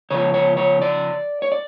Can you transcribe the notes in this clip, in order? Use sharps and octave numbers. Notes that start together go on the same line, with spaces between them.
C#3 F3 C#5
C#5
C#5
D5
C#5
D5